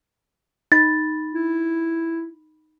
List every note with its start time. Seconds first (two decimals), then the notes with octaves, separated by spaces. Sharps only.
0.72 D#4 B5 A6
1.34 E4